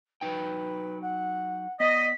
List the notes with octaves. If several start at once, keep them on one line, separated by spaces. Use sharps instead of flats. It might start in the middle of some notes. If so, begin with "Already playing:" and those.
F#3 D#4 B4 G5
F#5
B3 D5 D#5 B6